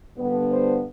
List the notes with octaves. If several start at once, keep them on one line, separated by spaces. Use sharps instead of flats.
G2 D3 G3 B3
C5